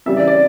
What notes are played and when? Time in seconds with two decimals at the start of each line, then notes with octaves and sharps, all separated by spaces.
0.06 C#3 E3 G3 E5
0.17 D5
0.27 D5